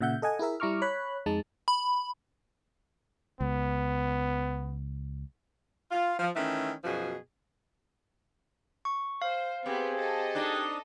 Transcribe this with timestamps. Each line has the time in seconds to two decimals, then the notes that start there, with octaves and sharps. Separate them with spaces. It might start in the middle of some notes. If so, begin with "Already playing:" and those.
0.01 A#2 C#3 E5 F#5 G6
0.22 A4 D#5 F#5 G#5
0.39 E4 G#4 A#4 E5
0.60 G3 E4 A#5 C#6 D6 F6
0.82 C#5 B5 F#6
1.26 F2 G#3 D#4 A5
1.68 B5
3.41 C#2 B3
5.91 F4
6.19 F3
6.36 D#3 E3 A3 C#4
6.84 F#2 B2 F3 G#4
8.85 C#6
9.22 C5 F5
9.66 B3 C4 G4 G#4
9.99 A4 D#5
10.35 D4 D#4